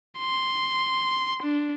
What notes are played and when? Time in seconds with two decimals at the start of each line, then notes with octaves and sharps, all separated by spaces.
0.19 C6
1.43 D4